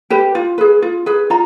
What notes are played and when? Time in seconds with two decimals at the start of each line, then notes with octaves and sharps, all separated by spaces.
0.10 G4 B4
0.35 F4
0.58 G#4 B4
0.82 F4
1.06 G#4 B4
1.30 F4 A#5